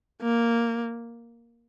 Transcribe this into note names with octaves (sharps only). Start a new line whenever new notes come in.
A#3